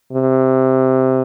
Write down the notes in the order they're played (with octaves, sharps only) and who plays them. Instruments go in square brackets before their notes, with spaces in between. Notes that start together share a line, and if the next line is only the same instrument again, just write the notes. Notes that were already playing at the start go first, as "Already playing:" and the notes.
[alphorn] C3